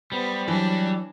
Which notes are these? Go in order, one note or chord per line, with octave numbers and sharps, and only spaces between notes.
G3 B3 C5
E3 F#3 D4